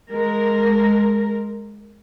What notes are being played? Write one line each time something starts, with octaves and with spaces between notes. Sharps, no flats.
G#3 A#4